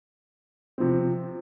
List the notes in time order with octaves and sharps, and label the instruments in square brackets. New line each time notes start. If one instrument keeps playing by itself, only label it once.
[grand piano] C3 F3 C4